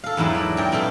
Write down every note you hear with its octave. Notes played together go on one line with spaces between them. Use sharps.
A4 F5
E2 G#2 F#3 E4
D5
F#2 G5
B2 A3 A4 F5 C6